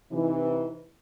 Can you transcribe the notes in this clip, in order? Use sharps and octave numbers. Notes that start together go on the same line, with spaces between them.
C3 E3 D#4